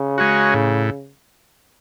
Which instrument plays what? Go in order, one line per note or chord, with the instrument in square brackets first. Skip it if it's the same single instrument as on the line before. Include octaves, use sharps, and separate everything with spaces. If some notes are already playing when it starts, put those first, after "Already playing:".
Already playing: [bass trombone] C#3
[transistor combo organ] G#3 C#4 F#4
A2